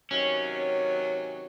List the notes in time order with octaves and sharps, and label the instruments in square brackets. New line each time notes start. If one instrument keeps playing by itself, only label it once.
[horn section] C3 D#3 F#3 [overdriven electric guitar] C#4